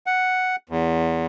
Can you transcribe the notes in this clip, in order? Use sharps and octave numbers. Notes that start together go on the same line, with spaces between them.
F#5
E2